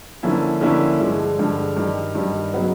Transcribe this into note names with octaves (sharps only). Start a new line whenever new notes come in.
D3 F3 A#3 C#4 E4
D3 F3 A#3 C#4 E4
G2 D3 F3 G#3
G2 D3 F3 G#3
G2 D#3 G3
G2 D#3 G3
C#3 F#3 B3 D#4